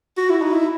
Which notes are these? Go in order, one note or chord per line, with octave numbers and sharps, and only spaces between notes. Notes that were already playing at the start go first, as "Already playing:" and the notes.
F#4
E4
D#4
E4